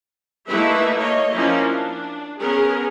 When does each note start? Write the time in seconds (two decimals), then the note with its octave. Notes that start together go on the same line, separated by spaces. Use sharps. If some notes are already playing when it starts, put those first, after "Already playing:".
0.47 A3 A#3 D#4 E4 B4 E5
0.96 A#3 C#5 D#5
1.34 F3 A#3 C#4 D#4 E4
1.67 D4
2.40 B3 C#4 G#4 A#4